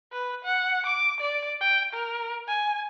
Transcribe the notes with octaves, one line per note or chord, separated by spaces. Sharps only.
B4
F#5
D6
D5
G5
A#4
G#5